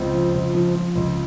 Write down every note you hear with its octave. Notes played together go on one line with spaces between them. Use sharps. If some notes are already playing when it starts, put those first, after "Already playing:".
Already playing: C#2 C4
F3
C#2
F3
F3
C#2